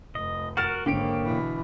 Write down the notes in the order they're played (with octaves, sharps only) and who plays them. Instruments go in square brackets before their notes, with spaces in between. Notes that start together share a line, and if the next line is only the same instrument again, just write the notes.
[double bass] F1 [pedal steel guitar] D#5
[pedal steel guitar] F#4 A#4 F#5 [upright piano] F6 A6 E7
[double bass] G#1 [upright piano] D3 D7 [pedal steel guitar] A#3 G4 C#5
[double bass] B2 E3